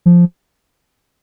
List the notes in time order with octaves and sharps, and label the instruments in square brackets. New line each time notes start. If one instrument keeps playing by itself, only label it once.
[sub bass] F3